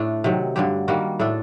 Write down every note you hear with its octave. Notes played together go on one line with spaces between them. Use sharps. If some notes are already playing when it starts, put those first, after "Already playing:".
Already playing: A2 A3 D4
C3 D#3 F#3
G2 D3 F#3 G4
D#3 G3 A#3 F#4
A2 A3 D4 A4